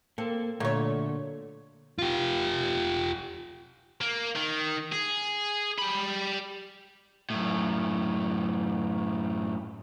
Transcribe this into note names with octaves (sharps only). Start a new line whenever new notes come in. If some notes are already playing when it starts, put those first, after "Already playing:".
A#3 C4 A4
A#2 D3 F#3 A3 A#3 C#5
F4 G4
A#3
D#3
G#4
G4 B5
F#2 A2